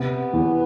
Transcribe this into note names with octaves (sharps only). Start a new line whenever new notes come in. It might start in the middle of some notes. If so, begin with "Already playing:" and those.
Already playing: C3 B3
E2